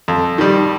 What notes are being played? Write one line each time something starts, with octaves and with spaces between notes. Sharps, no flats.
F2
D#3 G3